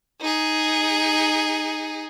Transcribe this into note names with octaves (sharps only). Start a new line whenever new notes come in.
D#4 G#4